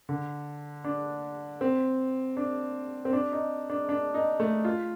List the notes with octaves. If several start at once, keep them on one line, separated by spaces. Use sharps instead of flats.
D3
D4
C4
D4
C4
D4
D#4
D4
D4
D#4
A3
F4